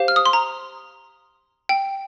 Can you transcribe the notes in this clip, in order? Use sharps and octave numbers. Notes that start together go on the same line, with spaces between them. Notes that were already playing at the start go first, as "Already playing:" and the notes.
Already playing: G4 C5 F5
F6
D#6
C6
A#5
G5